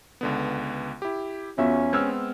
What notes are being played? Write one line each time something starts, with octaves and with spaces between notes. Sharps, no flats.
C#2 D3 B3
E4 G4
E2 C#4 F4 F#4 E5
G#3 B3 C4 E6 F6 G#6